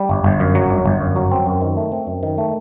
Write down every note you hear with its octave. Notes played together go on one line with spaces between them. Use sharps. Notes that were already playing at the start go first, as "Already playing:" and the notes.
Already playing: G3
G1
G1
F#2
F#3
G1
G1
F#2
F#3
C4
F#2
D#3
A3
C4
F#2
D#3
A3